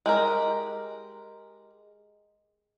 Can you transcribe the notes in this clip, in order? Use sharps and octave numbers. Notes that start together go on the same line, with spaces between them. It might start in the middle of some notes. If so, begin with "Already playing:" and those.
G#3 G4 A#4